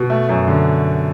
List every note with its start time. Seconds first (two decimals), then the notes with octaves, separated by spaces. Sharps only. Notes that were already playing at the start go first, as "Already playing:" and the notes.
Already playing: B2
0.10 A3
0.29 F#2
0.48 D3